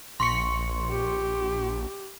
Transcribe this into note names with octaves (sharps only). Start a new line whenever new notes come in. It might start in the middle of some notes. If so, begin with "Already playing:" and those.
A#1 C6 C#6 C#7
G4